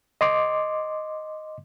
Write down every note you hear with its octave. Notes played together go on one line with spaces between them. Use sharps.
D#5 C6 D6